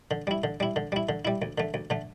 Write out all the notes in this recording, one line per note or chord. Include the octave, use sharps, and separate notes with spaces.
D3
G3 E4
D3
G3 E4
D3
G3 E4
D3
G3 E4
D2
D3 A3
D2
D3 A3